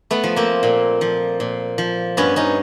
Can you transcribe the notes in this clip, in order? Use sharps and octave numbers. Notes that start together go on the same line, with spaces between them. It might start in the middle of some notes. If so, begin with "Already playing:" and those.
A3 B3
F3
A#3 C4
A#2
F3
A#2
F3
G2 B3 C#4
C#4 D#4